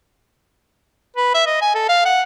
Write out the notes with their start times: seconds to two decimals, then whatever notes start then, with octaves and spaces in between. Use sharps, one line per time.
1.16 B4
1.34 E5
1.46 D#5
1.61 G#5
1.75 A4
1.89 F5
2.05 F#5